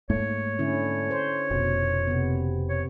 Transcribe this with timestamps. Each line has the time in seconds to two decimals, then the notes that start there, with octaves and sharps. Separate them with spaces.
0.10 G#2 A3 A#3 C#5
0.59 D3 C#4 E4
1.11 C5
1.51 F1 B2
2.07 C3 B3
2.69 C#5